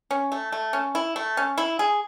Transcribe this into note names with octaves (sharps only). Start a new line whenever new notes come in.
C#4
A3
A3
C#4
E4
A3
C#4
E4
G#4